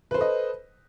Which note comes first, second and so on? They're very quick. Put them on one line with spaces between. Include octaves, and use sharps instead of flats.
B4 C5 A4 D#5